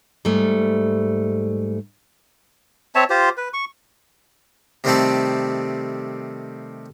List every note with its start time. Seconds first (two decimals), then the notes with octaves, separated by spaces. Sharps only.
0.25 G#2 G3 A3
2.95 C4 C#5 E5 A5
3.10 F4 G4 C5
3.37 B4
3.53 C#6
4.84 C3 D#3 G3 A3 C4 A4